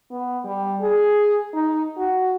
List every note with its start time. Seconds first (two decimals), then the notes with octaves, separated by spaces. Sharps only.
0.11 B3
0.44 G3
0.81 G#4
1.54 D#4
1.97 F#4